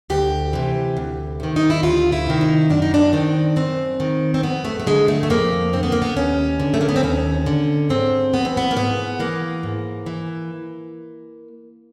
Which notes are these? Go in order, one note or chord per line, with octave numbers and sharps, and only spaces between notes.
D2 G4
C3 E3
D2
C3 D#3
D#4
E4
D2 F4
E4
C3 D#3
D#4
F#2 D4
D#4
D4
D#3 C4
F#2 C4
D#3
C4
F2 B3
A3
A3
D3 G#3
A3
A3
F2 A#3
D3 C4
B3
A#3
B3
D#2 C#4
D3
A3
A#3
B3
C4
D#2 C#4
D3
G#2 C4
E3 B3
C4
B3
A#3
G#2 B3
E3 A#3
G#2
E3